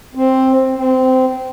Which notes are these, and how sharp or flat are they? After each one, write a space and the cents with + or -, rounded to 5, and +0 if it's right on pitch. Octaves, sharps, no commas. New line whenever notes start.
C4 +5
C4 -20